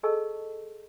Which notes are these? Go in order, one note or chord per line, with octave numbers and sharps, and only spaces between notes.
G#4 A4 D#5 A5 C#6 E6